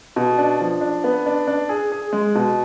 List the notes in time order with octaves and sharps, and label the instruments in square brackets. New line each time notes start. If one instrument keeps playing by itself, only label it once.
[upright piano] B2
D4
F3
D4
B3
D4
D4
G#4
G#4
G#3
B2